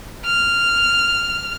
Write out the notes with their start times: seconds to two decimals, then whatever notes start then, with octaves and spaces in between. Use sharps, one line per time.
0.25 F6